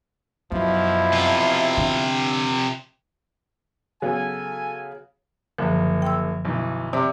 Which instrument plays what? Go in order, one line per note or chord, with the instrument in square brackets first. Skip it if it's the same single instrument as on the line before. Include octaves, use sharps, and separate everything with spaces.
[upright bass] F#2 [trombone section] B2 F3 E4
[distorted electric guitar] C3 F4
[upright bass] D3
[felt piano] C#3 F#3 B3 [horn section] A4 G#5
[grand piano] F#1 [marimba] F#2 D3 F3
[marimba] G5 C6 E6
[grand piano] B1 E3
[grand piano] C3 [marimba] D5 C6